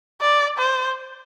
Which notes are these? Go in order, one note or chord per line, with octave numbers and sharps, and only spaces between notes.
D5
C5